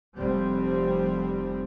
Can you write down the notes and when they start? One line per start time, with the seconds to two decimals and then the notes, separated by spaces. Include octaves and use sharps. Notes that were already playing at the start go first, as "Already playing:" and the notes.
0.17 F1 G3 C4